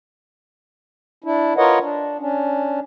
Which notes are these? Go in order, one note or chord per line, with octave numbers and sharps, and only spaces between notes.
D4 E4
F4 A#4 B4 C#5 D#5 F#5
D4
C#4 D4